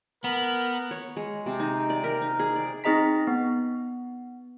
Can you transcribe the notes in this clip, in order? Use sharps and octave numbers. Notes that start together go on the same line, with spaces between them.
B3 A#4
C#5
G#3
C3
D#4
D5
A#4
D#4
G#4
D5
C4 D#4 G#4 D#5 A#5 B6
B3